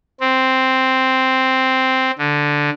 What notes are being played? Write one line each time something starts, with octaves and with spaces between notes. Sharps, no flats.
C4
D3